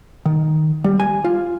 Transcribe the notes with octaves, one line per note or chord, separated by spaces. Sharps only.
D#3
G3
G#5
F4